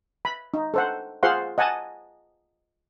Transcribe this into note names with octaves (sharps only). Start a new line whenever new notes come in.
B5
D#4
A4 C5 F#5
F4 G#4 C5 F5 F#5 C6
D#5 F#5 G#5 A5